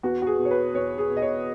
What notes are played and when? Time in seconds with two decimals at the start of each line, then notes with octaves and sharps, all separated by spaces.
0.03 E2 F#4
0.22 F#4
0.27 G#4
0.39 B2
0.45 C#5
0.51 B4
0.74 E2 C#5
0.98 G#4
1.10 B2
1.17 D#5
1.22 C#5